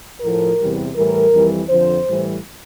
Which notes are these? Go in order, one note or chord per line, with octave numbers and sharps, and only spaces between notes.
A2 F3 A#4
E2 C3 E3 G3
A2 E3 G3 A#4
F2 E3 G3
F2 D3 F3 C5
A2 E3 G3